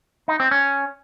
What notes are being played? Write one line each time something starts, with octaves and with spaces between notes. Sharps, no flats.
D#4
C4
C#4